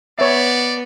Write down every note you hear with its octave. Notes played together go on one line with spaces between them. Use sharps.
B3 C#5 D5 E5